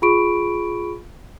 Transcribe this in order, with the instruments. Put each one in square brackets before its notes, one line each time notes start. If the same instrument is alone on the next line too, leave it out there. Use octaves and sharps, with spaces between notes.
[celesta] F4 G#4 B5 C#6 D7